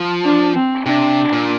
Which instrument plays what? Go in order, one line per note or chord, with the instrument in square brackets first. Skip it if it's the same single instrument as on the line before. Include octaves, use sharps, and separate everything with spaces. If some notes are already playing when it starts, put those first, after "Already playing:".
Already playing: [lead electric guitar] F3
[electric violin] D4
C4
[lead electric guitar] C3 [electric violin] D4
[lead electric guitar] A#2